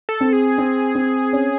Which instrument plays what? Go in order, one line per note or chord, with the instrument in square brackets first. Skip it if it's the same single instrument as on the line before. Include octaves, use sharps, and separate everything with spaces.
[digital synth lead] A4
[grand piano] C4
[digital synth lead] G#4
[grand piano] C4
C4
C#4